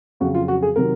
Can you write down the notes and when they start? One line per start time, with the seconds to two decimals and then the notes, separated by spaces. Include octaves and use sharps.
0.20 F2 C#3 F#3 C4 F#4
0.34 F4
0.48 F#4
0.62 G#4
0.76 C3 D#3 F#3 A#4